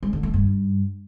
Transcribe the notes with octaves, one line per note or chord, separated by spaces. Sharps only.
G#3
D3
A3
G2